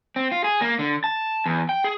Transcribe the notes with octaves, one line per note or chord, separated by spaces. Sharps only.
C4
F4
G#4
A#3
D3
A5
E2
G5
G#4